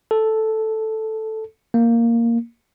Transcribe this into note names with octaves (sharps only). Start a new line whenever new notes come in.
A4
A#3